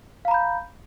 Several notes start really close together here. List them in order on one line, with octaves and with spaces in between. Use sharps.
F5 A#5 B5 G6